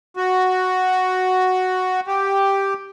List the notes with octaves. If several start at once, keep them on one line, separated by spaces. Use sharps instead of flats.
F#4
G4